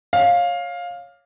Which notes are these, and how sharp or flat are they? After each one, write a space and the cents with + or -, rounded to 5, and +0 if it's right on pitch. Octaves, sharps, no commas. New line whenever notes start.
C#5 +0 F5 +10